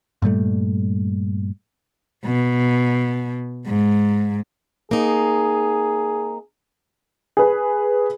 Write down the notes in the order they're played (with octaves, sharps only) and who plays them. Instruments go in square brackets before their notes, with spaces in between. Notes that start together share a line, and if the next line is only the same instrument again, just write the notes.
[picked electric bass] G2 A#2 G3 A3
[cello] B2
G#2
[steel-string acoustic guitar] A#3 C4 D#4 [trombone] G#4
[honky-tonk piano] G#4 B4